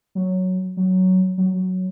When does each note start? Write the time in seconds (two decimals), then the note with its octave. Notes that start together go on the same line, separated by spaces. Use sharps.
0.15 F#3
0.77 F#3
1.38 F#3
1.54 F#3